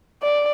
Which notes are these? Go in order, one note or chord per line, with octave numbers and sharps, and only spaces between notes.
D5